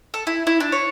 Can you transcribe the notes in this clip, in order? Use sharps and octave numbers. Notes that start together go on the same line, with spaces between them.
A4
E4
E4
D4
C#5